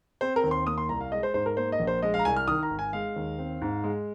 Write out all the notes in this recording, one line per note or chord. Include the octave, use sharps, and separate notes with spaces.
C4 C5
A#4
D#2
C6
A#3 D#6
C6
C2 A#5
F5
G#3 D#5
C5
G#2 C5
A#4
A#3 C5
D#5
A#1
C5
G#3 D#5
F5
A#5
C2 G#5
F6
D#3 D#6
A#5
G#1
G#5
G#3 F5
D#2
C4
G#2
G#3